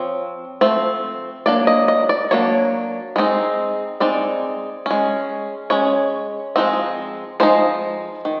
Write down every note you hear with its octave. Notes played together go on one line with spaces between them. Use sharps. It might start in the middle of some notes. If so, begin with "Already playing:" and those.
Already playing: F3 C4 C#5
F3 A3 C4
F#3 A#3 D4 D5
D#5
D#5
D5
F#3 A#3 D4 C#5
G#3 C4 D#4
G#3 C4 D#4 D5
G#3 C#4
G#3 C#4 C#5
F3 G#3 C4 D#4
F3 G#3 D#4 C5
D#3